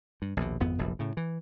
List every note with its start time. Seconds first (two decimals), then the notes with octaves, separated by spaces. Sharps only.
0.22 G2
0.37 A#1 D#2 B2
0.60 G#1 F2 B3
0.78 F1 A#1 F#2
0.99 A2 C#3
1.17 E3